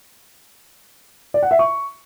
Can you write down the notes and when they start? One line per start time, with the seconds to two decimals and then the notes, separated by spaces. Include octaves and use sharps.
1.34 D5
1.43 F#5
1.51 E5
1.59 C#6